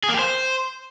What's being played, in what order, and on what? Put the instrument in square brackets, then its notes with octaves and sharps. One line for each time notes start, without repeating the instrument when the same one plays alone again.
[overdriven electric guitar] G#4
A#3
G4
C5